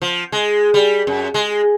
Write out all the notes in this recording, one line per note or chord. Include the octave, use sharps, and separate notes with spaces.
F3
G#3
G3
F#2
G#3